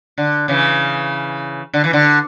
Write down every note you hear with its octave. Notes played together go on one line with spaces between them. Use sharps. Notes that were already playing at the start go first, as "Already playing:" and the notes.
D3
C#3 E3
D3
E3
D3